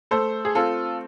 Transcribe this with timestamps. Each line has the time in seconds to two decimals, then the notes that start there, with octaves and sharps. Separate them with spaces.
0.11 A3 A4 C5
0.45 G#4
0.55 C4 F4 A4